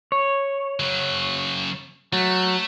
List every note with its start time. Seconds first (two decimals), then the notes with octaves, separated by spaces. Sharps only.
0.12 C#5
0.80 C#3 F#3
2.13 F#3 A3